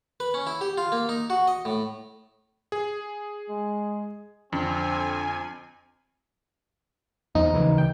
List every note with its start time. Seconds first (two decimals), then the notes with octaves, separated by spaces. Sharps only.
0.20 B4
0.34 C#4
0.47 E4
0.61 G4
0.78 F4
0.92 A#3
1.09 D#4
1.30 F#4
1.48 D#5
1.65 A2
2.72 G#4
3.50 G#3
4.52 F2 D3 C4 G#5
7.35 E2 F3 D#4
7.54 D2 C#3 E3
7.78 G5